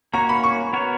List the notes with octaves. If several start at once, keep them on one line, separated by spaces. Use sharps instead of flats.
A#3 C#4 F#4 C#5 A#5
B5
C#6
B3 F#4 A#4 C#5